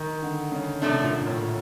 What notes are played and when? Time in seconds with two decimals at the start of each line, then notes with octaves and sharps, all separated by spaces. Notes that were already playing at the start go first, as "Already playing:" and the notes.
Already playing: D#3
0.22 D3
0.52 C#3
0.82 C3 F3 A3 D4
1.03 A#2
1.21 A#2
1.27 A2